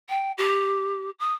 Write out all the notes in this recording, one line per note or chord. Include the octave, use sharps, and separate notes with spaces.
G5
G4
D#6